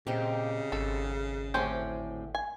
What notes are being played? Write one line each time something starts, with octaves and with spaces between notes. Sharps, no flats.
A#2 C#3 C4 D#4 G4
G#1 A4
D2 A2 C4 C#4 G4 C5
G#5